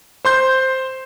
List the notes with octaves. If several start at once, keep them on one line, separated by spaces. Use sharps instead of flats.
C5 C6 G6